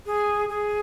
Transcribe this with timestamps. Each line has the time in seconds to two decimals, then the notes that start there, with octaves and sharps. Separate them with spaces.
0.06 G#4
0.49 G#4